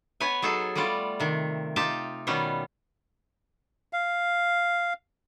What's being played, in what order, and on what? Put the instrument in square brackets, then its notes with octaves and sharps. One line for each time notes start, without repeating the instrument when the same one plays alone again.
[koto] B3 B4 C#5 G#5
F#3 D#4 G#4 A4
G3 A3 B3 F4 D5
C3 D#3
D#4 F4 G4 A5
B2 D#3 G3 B3 C#4
[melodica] F5